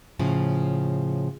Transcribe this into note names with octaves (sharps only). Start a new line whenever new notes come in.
A2 C#3 F3